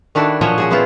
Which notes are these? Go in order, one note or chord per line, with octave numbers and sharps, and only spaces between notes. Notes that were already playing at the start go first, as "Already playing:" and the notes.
D#3 D4 E4 F#4 A4
A#2 F3 F#3 F#4 C#5 D#5
C#4 F#4 G#4
G#3 B3 C4 E4 F4